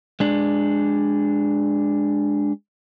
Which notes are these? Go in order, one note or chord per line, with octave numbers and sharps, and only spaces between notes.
G#3 D4